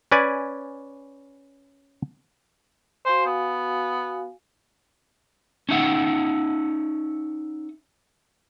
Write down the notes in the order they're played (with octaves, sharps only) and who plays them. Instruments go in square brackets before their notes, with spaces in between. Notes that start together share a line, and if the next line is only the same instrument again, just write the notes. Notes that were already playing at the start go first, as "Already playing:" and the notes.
[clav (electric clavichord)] C#4 B4 D5 G#5
[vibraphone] F#4 F5 G#5 [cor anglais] C5
[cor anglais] B3
[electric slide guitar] C#4 D#4 E5 F#5